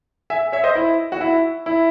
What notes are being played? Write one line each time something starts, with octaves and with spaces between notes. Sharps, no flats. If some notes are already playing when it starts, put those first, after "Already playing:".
E5 G#5
C#5 E5
C5 D#5
E4
F#4
E4
E4